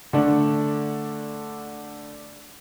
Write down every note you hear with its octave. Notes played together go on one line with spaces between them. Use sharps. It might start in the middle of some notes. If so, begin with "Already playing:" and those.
D3 A3 D4